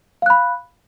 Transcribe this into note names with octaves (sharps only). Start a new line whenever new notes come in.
F5 B5 F#6